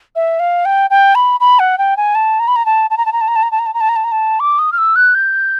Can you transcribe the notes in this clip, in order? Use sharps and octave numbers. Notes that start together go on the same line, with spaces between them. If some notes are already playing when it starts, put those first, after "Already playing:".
E5
F5
G5
G5
B5
B5
F#5
G5
G#5
A5
A#5
B5
A#5
A5
A5
A#5
A5
A#5
A5
A#5
A5
A#5
A5
A#5
A5
A#5
A5
A#5
A5
A#5
A5
D6
D#6
F6
E6
F#6
G6